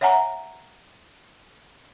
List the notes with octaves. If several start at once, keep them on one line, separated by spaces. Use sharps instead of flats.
C#5 E5 F#5 G#5 A#5